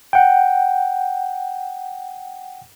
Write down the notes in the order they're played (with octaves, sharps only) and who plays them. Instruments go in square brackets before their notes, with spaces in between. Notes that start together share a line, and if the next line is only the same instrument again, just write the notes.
[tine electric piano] F#5 G5